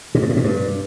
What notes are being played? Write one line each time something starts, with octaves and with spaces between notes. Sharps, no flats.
A#2
G2
A2
A#2
G2